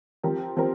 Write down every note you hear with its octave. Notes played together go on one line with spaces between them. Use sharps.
F3 C4 G4 A#4
F3 C4 G4 A#4